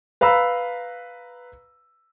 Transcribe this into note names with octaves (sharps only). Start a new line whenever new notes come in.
B4 F5 A#5 B5 E6